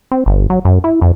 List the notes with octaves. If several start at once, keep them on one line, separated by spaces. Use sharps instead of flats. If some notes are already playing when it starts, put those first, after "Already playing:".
C4
G1
F#3
F#2
E4
F2